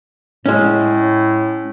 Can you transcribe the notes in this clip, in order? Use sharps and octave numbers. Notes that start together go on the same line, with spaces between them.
A2 G#3 C#4